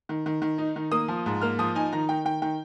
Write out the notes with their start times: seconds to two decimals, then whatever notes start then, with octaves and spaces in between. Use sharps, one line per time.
0.09 D#3
0.26 D#3
0.42 D#3
0.58 D#4
0.76 D#3
0.91 A#3 D#6
1.08 F3
1.26 G#2
1.41 A#3 F6
1.59 F3 D#6
1.75 D#4 G#5
1.92 D#3 A#5
2.09 D#3 G5
2.25 D#3 G5
2.42 D#3 G5